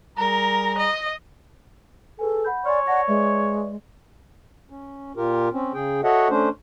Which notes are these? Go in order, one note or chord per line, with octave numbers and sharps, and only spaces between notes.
G3 G#4 A#4 A#5
D#5
G#4 A4 B4 G#5
F#5 B5 G6
C#5 D5 G#5 C6 F6
D5 F#5 A5 A#6
G#3 B4 D5 E5
C#4
A#2 F4 G4 A#4
C4 C#4
C#3 G#4 G5
F#4 A4 C#5 D#5 E5 F#5
A3 C#4 D4 C5